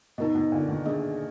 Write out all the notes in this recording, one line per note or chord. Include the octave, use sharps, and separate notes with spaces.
B2 D#4 A#4 D#5
B2
A#2 D3
B2 D#3
A#3 D4 G#4 D#5